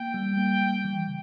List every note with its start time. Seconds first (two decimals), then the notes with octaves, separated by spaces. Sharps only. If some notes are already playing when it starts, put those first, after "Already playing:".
Already playing: A#3 G5
0.14 G3
0.37 A#3
0.61 G3
0.84 E3
1.07 C#3